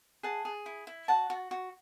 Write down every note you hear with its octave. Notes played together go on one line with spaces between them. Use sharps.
G#4 F#5 A5
G#4
E4
E4
F#4 F#5 A5
F#4
F#4